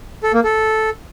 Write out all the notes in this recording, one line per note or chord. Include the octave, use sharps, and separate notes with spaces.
A4
A#3
A4